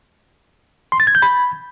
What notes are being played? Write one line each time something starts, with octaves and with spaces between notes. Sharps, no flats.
C6
A6
G#6
G6
B5